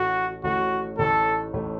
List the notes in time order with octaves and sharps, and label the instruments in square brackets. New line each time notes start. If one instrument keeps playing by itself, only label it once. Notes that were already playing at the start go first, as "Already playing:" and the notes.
Already playing: [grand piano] A1 A2 A3 [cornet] F#4
[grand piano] A1 A2 A3 [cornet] F#4
[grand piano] A1 A2 A3 [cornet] A4
[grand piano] A1 A2 A3